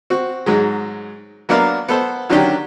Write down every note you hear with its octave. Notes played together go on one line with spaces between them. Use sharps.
C4 F#4
G#2 F#3 G#3
F#3 A#3 B3 D4 A#4 F5
B3 A4 C5
D3 D#3 F#3 C#4 D4 G4